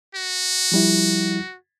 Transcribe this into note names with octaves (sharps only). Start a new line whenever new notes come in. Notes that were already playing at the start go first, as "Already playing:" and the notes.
F#4
F3 G3 E4